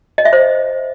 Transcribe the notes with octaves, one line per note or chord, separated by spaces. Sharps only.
D#5
E5
C5